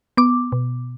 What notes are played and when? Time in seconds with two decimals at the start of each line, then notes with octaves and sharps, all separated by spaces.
0.17 B3 D6
0.52 B2